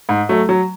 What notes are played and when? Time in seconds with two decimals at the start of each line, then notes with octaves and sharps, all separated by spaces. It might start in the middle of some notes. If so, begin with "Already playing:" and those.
0.09 G#2
0.29 F#3 A3
0.49 F#3